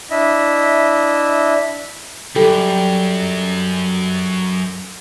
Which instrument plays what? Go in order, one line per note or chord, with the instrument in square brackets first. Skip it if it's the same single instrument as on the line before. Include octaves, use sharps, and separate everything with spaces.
[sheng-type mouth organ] D4 E4 D#5 E5
[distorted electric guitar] F#2 [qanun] G3 [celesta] A4